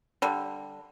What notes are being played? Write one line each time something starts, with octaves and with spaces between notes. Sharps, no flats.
D3 G3